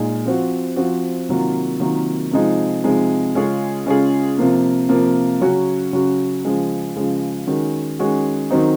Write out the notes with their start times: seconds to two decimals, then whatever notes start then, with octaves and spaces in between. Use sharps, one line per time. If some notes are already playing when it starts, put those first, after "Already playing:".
Already playing: A#2 G#3 D#4
0.26 F3 C4 F#4
0.76 F3 C4 F#4
1.29 C3 D#3 F#3 A#3 F4
1.80 C3 D#3 F#3 A#3 F4
2.31 C3 F3 G#3 D#4
2.84 C3 F3 G#3 D#4
3.35 C#3 G#3 C#4 F4 G#4
3.86 C#3 G#3 C#4 F4 G#4
4.38 C3 F3 A#3
4.89 C3 F3 A#3
5.41 C#3 F#3 C#4 F#4
5.93 C#3 F#3 C#4 F#4
6.45 C#3 F3 G#3
6.96 C#3 F3 G#3
7.47 D#3 G#3 C#4 F#4
7.99 D#3 G#3 C#4 F#4
8.50 D#3 F#3 C4 D#4